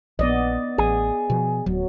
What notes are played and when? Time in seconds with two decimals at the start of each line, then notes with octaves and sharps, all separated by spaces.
0.19 A#1 B3 D5 D#5
0.78 A1 G#4
1.30 B2 F3
1.66 D1 F#3